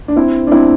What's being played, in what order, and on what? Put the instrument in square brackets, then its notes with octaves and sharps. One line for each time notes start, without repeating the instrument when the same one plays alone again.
[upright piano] D4
C4 E4
D4
C4 E4